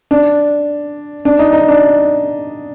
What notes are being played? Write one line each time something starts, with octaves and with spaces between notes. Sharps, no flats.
D4
D4
D#4
D#4
D4